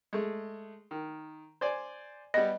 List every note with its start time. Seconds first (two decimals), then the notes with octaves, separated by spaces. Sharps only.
0.13 G#3 A3
0.91 D#3
1.61 C5 D5 G#5
2.34 G3 B3 D#5